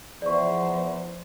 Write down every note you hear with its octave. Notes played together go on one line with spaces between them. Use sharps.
E2 F3 C5 D5 C#6